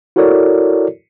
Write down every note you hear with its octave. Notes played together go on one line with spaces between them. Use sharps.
E4 F#4 A4 A#4 C#5 D5